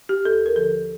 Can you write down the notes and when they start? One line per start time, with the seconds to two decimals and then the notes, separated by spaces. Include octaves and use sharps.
0.09 G4
0.25 D#2 A4
0.46 A#4
0.56 D3 F3 A4